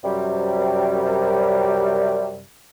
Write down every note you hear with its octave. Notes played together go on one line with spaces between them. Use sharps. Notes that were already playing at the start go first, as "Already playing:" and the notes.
F#2 C3 G3